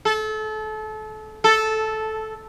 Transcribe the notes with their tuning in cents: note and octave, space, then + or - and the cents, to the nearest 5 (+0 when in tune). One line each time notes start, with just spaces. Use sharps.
A4 -30
A4 -10